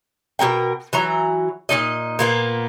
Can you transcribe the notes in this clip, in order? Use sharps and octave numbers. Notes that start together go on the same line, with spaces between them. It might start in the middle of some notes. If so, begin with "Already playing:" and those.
B2 C#4 A#4 G5
E3 F#3 A#5
A#2 E3 D#4 D#5
A#2 A#3 B3